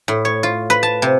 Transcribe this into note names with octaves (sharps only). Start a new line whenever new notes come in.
A2
C#5
F4
B4
A5
C3